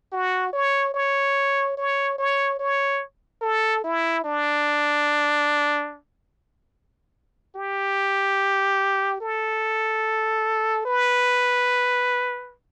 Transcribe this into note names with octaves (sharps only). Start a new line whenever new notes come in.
F#4
C#5
C#5
C#5
C#5
C#5
A4
E4
D4
G4
A4
B4